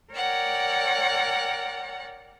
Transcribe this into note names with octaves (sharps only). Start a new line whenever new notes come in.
A#4 C#5 D5 F#5 G5